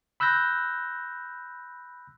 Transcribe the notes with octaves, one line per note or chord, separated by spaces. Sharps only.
B5 E6 F#6 G6 A#6